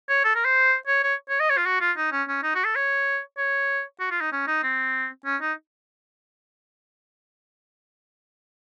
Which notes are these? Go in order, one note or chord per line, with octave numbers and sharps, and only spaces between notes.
C#5
A4
A#4
C5
C#5
C#5
C#5
D#5
C#5
F4
F#4
F4
D#4
C#4
C#4
D#4
F#4
A4
C#5
C#5
F#4
F4
D#4
C#4
D#4
C4
C#4
D#4